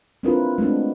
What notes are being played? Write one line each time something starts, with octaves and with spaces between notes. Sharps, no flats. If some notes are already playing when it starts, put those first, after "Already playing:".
C4 D4 E4 F4 A#4 B4
G#3 A3 B3 C4 D4